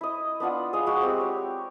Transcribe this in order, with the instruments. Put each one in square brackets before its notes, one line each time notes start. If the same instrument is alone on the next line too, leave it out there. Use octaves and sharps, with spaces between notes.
[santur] E4 D#5
B3 D4 F4 F#5
G#4 D#5 F5
G#3 F#4 E6
C4 G4
C#5